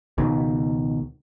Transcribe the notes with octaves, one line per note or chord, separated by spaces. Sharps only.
C#2 B2 D#3